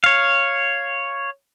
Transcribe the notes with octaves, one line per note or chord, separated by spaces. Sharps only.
C#5 F5